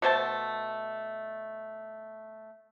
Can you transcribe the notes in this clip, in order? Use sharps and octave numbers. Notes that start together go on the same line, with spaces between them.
B2 A3 C5 A5